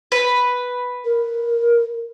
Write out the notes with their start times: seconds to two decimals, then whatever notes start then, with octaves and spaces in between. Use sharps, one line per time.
0.12 B4
1.05 A#4